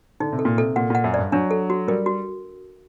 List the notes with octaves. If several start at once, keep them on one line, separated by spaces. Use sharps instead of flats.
D3 D#4
C3
A4
A#2
C3 A4
A#2 F#5
A#2 F#5
F#2
G2 D5
F#3 D4
A4
F#4
G3 A#4
F#4